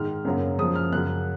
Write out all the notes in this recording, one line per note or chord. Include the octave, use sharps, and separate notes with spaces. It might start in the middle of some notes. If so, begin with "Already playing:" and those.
Already playing: G#2 D#3 G#3 F6
F#2 C#3 F#3 A#3
F#2 F3 G#3 D#6
F6
F#2 C#3 F#3 F#6